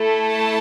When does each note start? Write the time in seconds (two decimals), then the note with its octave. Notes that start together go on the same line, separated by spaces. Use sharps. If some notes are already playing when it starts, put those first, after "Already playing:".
Already playing: A3 E4 A4
0.29 A5